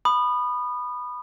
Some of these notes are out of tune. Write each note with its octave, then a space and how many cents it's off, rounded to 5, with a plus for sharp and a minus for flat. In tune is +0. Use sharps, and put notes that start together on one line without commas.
B5 +0 D#6 -30